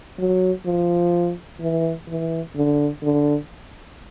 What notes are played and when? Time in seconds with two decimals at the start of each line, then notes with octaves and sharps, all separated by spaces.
0.19 F#3
0.66 F3
1.60 E3
2.08 E3
2.55 D3
3.03 D3